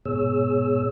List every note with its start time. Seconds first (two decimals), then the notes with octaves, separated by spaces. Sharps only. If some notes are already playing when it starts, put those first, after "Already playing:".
0.06 G#2 B2 B3 G#4 C#5 E6